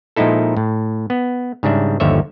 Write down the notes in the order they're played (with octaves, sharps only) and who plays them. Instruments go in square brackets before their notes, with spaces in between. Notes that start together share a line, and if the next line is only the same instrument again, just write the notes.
[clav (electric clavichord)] A#2 F3 G#3 D#4 E4 A4
A2
B3
G#2 C#3 G3 D4 E5
G1 D#2 D3 F3 C#5 E5